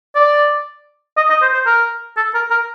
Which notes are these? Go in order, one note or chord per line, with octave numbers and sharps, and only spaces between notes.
D5
D#5
D#5
C5
C5
A#4
A4
A#4
A#4